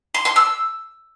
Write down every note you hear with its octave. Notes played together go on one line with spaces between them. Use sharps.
C6
C6
E6